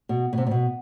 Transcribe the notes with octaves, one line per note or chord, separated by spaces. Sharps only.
B2
B2
C3
A#2
B2